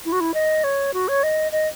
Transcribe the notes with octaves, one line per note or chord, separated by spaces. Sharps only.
E4
F#4
E4
D#5
C#5
F#4
C#5
D#5
D#5